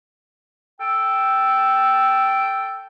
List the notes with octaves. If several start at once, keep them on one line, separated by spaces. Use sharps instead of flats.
A4 G5